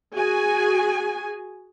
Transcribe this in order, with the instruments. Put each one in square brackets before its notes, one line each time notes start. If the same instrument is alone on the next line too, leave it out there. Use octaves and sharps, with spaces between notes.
[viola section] F#4 G#4 G#5